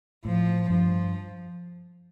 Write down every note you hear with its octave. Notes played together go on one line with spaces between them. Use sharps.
A2 F3
G2 F3